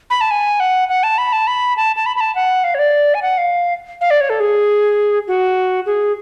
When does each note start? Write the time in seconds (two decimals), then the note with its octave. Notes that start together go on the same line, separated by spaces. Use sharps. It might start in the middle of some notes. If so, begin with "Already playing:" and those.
0.10 B5
0.21 A5
0.31 G#5
0.60 F#5
0.89 F#5
1.03 A5
1.18 B5
1.33 A5
1.47 B5
1.77 A5
1.96 A5
2.06 B5
2.16 B5
2.21 A5
2.35 F#5
2.64 F5
2.75 C#5
2.79 D5
3.14 G#5
3.22 F#5
3.38 F5
4.01 F5
4.10 D5
4.21 C#5
4.30 A4
4.40 G#4
5.28 F#4
5.86 G#4